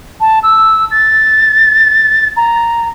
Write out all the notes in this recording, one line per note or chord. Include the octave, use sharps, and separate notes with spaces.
A5
E6
A6
A#5